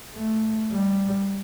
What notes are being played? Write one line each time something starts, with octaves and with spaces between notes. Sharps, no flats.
A3
G3